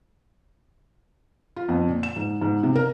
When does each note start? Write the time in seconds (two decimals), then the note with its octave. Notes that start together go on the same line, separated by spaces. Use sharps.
1.56 F4
1.69 F2
1.88 A#2
2.03 E7
2.16 G#2
2.41 G#2
2.63 C3
2.75 A#4